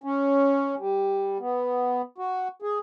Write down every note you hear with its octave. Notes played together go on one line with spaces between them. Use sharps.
C#4
G3
B3
F#4
G#4